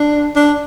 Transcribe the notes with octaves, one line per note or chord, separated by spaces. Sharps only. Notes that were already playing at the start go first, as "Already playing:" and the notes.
Already playing: D4
D4